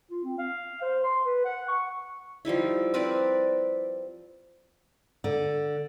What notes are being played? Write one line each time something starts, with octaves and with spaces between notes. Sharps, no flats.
F4
C4
F5
C5
C6
B4
F#5
C#6
F3 G3 D#4 E4
C4 A#4 B4 D5
D3